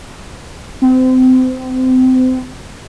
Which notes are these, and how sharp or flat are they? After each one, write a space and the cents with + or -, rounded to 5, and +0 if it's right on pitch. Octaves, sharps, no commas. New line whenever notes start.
C4 -30